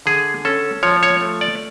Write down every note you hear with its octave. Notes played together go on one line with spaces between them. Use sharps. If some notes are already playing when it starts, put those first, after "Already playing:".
D3 G#4
C#4 A4
F3 C#5
C#5
A3
D5